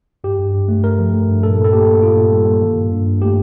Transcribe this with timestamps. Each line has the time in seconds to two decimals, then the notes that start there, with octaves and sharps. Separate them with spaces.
0.24 G2 G4
0.39 G2
0.54 G2
0.68 A3
0.83 A3 A#4
0.99 F3
1.14 A3
1.28 G2
1.43 A#2 A4
1.58 A#2
1.64 A4
1.73 A#3 G4
1.88 A#3
2.02 A#2 F4
2.17 A#2
2.32 G3
2.47 A#3
2.62 D#3
2.77 G2
2.92 G2
3.07 G2
3.22 A3 G4